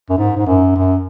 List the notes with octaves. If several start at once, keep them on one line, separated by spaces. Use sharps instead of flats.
F#2
G#2
G#2
F#2
F#2